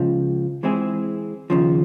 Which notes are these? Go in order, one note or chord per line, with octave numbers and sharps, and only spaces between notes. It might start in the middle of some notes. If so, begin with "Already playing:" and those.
Already playing: C#2 C#3 F3
E3 G#3 C4 E4 G#4
D#2 C#3 F3